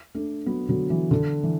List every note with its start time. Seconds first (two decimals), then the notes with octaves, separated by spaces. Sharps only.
0.15 A3 D4
0.46 F#3 B3
0.69 D3 F#3
0.90 E3
1.11 D3
1.43 E3